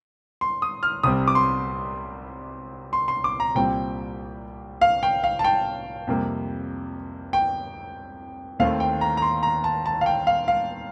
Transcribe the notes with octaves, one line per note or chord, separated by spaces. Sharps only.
C6
D#6
F6
C2 C3 G3 C4 D#6
D6
C6
C6
C6
D6
A#5
C2 A#2 G3 C4 G5
F5
G5
F5
A5
G5
F2 C3 G3 A#3
G5
D#2 D#3 A3 C4 F5
G5
A#5
A#5
C6
A#5
A5
A5
F5
G5
F5
F5